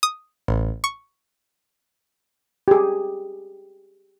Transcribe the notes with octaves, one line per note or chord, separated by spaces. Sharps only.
D#6
A1
C#6
G4 G#4